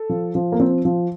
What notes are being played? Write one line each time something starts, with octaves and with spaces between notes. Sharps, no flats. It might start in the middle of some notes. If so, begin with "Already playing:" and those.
Already playing: A4
F3
F3
A#3
F3 C4
F3